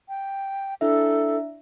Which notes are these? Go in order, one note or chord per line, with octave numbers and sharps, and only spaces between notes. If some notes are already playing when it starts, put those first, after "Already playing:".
G5
D4 E4 A4 E5